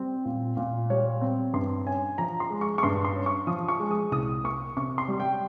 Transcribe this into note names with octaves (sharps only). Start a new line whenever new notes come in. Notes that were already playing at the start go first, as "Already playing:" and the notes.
Already playing: G3 C4
A#2
A#2
G3 C#5
C4
G2 C6
C#4 G#5
F3 A#5
C6
G#3
C#6
C#6
G2 C6
C6
C#4
C#6
F3 D#6
C#6
G#3
D#6
C2 D#6
A#3 C#6
C3 C#6
C6
G3
G5